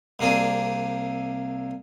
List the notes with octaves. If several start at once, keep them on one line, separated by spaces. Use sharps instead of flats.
C2 C3 A#3 D4 G#4